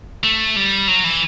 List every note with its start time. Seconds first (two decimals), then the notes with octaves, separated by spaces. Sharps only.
0.23 A3
0.56 G3
0.88 F#3
1.04 E3